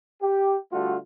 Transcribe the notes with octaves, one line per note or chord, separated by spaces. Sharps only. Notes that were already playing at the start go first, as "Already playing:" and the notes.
G4
D3 G3 A3 F4 F#4